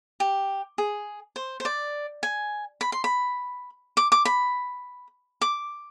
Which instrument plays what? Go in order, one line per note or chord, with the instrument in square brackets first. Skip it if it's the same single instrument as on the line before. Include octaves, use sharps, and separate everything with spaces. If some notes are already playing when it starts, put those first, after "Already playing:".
[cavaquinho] G4
G#4
C5
C5
D5
G#5
B5
C6
B5
D6
D6
B5
D6